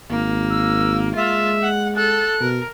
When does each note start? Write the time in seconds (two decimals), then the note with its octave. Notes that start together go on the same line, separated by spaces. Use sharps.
0.11 G#1 A#3
0.50 E6
1.16 G#3 F4 E5
1.63 F#5
1.96 A4 F#6
2.41 B2 A#4